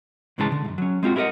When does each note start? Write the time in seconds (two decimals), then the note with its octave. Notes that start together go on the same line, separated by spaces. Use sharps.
0.38 G#2 C#3 E3 G#3 A4 A5
0.52 D3
0.65 C2 F#2
0.78 F#3 C#4
1.03 G#3 C4 F4 F#4
1.16 E4 G4 A#4 B4 D#5 F#5